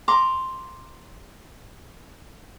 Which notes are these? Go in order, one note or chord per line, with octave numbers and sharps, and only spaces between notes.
A#5 C6 D6